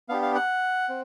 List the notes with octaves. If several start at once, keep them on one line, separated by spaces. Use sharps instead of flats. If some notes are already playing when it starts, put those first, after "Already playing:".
B3 D4 G4 F5
F5
F#5
C4